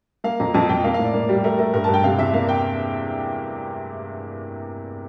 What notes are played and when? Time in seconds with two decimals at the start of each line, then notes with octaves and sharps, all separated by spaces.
0.24 A#3 F5
0.40 F2 A#5
0.54 F2 A5
0.69 F2 G5
0.84 A#3 F5
0.94 F5
0.99 A2 D5
1.14 A#3
1.29 G3
1.44 A3 A#4
1.59 A3 A#4
1.73 G2 A#4
1.84 A5
1.89 G2
1.94 G5
2.04 C3 F5
2.19 E2 E5
2.34 A#3 F5
2.49 G5